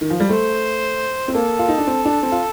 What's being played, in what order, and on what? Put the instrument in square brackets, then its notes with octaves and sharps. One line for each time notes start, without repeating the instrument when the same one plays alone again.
[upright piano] D#3
F3
G3
[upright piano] A3 [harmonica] C5
[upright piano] C4
[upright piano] A#3 [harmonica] A4
[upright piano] F4
D#4
D4
C4
D4
C4
F4